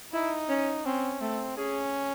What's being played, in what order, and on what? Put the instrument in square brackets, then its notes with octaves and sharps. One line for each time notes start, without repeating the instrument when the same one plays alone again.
[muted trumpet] D#4 [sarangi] E4
[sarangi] C#4
[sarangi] C4 [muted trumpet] C#4
[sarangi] A3 [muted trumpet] C4
[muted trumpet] C#4 [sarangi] G#4